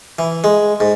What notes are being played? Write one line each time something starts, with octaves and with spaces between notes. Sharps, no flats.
E3
G#3
G#2